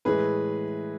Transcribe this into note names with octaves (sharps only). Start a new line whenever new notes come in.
A2 E3 G#3 G#4 B4